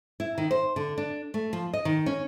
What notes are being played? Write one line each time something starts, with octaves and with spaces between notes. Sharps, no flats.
E4
D#3
C5
D3
D4
A3
F3
D#5
D#3
C#4